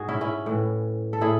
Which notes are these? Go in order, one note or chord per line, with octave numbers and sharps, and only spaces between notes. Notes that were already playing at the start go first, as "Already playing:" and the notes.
Already playing: G#2 F#4 G#4
C#4 E4
C#4 E4
A2 E3
A4
A2 E4 G#4